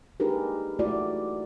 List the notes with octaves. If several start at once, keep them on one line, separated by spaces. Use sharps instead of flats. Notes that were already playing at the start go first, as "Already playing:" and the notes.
D4 D#4 G4 G#4 A#4 B4
A3 E4 F#4 D5